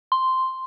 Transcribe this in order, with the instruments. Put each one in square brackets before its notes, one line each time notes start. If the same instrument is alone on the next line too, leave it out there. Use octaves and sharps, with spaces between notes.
[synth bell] C6